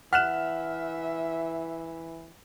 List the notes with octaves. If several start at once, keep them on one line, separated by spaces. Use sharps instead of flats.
E3 E5 F#5 F6 F#6 E7